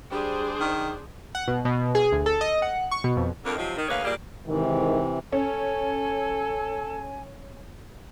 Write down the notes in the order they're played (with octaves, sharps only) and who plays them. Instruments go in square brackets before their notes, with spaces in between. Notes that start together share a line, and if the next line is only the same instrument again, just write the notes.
[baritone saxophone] G3 [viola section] D4 G#4 C5
[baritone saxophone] D#3
[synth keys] F#5
B2
B2
G#4
D2
A4
D#5
F#5
C#6
B2
F2
[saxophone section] F2 D3 A#4
C3 F3 F#3 C4 D#4 F4
D#3
D2 A#3 G#4 B4 C#5 F5
A#2 G3 A#3 G4 G#4 D5
[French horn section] G#2 D#3 [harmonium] C3 E3
[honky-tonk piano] C#4 [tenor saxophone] A4 [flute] G#5